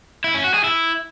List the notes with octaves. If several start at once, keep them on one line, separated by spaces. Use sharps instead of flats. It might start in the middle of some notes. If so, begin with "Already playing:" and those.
E4
C#4
F#4
G#4
E4